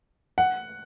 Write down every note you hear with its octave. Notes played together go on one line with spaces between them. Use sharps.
F#5